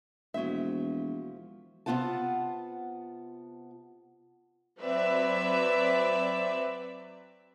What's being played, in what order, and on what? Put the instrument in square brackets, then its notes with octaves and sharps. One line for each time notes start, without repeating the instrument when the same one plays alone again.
[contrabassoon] E1 [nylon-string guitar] F3 E5 [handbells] A#3 F#4
[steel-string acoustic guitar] C3 A3 B3 F4 F#5 A5
[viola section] F#3 C4 B4 D5 E5